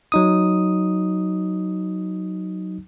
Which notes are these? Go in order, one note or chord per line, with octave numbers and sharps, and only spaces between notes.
F#3 D#4 D#6